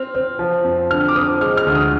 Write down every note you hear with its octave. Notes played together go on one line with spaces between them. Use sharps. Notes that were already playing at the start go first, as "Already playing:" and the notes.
Already playing: C4 F6
C4
F3
F2
D3 F6
D6
C4 D#6
G#3 F6
F6
D2
D#6